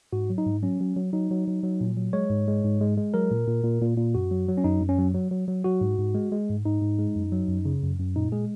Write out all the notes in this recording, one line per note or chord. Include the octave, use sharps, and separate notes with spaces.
G#2 F#4
F#3
D#4
G#2
F#3 C#4
F#3
F#3
F#3 D#4
F#3
F#3
F#3
A#2
F#3
G#3 C#5
G#2
G#3
G#2
G#3
G#3
F#3 A#4
A#2
A#2
A#2
A#2
A#2
F#2 F#4
F#3
F#3
C#4
F#2 D#4
F#2
C#4
F#3
F#3
F#3
F#3
F#3 F#4
G#2
G#2
G#3
G#3
G#2
G#2 D#4
G#2
G#3
F#2
F#3
F#2
C#3
F#2
F#2
A#2 D#4
G#3 G#4